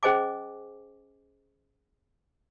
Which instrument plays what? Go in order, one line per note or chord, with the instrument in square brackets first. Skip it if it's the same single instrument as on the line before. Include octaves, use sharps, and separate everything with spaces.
[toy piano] C#4 G#4 C5 D#5 G#5 D6